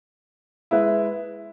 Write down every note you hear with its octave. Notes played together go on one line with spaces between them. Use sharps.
G#3 E4 B4